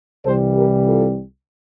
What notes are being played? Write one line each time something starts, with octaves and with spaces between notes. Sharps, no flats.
C2 C3 E3 G3 A4 C5
G4 A#4
F4 A4